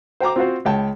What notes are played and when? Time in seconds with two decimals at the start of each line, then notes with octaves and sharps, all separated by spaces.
0.20 C5 G5 A#5 D6
0.36 C4 F4 F#4 C5
0.65 C#2 C#5 G5 A5